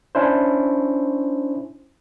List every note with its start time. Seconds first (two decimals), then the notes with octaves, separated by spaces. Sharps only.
0.15 C#4 D4 E4 C5